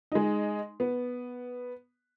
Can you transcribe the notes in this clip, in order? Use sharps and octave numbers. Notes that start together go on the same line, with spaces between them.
G#3 D#4
B3